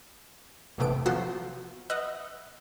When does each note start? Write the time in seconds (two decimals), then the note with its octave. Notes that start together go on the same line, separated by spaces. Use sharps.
0.78 G#1 E2 C3 A3 B3 D7
1.06 F3 F#3 B3 F#4 A4 C5
1.90 B4 D#5 E5 F#5